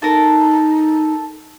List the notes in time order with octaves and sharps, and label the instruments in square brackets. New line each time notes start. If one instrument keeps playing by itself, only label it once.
[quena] D#4 [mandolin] A4 A#4